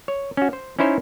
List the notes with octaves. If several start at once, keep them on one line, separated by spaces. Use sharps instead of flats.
C#5
C#4 F#4
C5
C#4 D#4 E4 C5 C#5